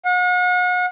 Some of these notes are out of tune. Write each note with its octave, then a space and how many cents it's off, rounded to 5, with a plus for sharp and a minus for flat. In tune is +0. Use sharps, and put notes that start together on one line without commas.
F#5 -40